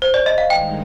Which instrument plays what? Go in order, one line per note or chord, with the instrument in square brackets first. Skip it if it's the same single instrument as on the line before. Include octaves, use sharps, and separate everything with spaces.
[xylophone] C5
D5
D#5
F5
[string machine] G2 D#3 G#3 D#4 [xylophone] G5